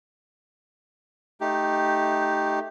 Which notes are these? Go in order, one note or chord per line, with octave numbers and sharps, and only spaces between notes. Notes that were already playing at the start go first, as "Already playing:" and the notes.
A3 D#4 G4